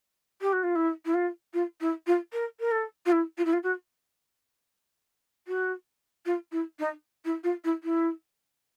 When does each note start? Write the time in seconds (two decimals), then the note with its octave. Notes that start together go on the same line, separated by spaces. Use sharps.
0.41 G4
0.53 F#4
0.63 F4
0.76 E4
1.05 E4
1.14 F4
1.54 F4
1.81 E4
2.07 F4
2.33 A#4
2.60 A#4
2.72 A4
3.06 F4
3.12 E4
3.38 F4
3.45 E4
3.53 F4
3.63 F#4
5.48 F#4
6.26 F4
6.52 E4
6.79 D#4
7.25 E4
7.44 F4
7.64 E4
7.84 E4